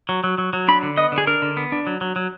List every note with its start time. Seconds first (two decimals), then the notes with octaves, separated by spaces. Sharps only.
0.09 F#3
0.24 F#3
0.38 F#3
0.53 F#3
0.68 D4 B5
0.83 D3
0.97 B3 D#5
1.12 D3
1.18 G#4
1.27 D4 A#4
1.42 D3
1.57 B3
1.72 D4
1.87 F#3
2.01 F#3
2.16 F#3